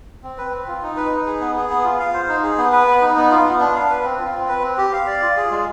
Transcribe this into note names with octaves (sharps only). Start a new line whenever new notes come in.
C4
B4
C4
F4
D#4
B4
D#4
G#4
B3
G#4
B3
F4
F5
C5
D#4
G#4
B3
B4
B3
D#4
B3
F4
B3
D4
F5
B4
C4
F4
C4
B4
C4
G4
F5
D5
F4
G#4
G#3